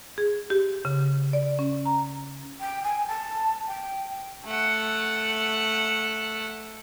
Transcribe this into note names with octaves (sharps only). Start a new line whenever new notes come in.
G#4
G4
C#3
D5
C#4
A#5
G5
G#5
A5
G5
A3 F#5